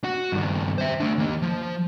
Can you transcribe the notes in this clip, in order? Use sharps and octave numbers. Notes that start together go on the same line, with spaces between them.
F#4
G2 D#3
C5 E5
A3 D4
D#2 A#3
F3